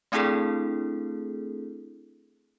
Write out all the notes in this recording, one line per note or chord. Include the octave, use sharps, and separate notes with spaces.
A3 C4 D4 E4 G#4 A4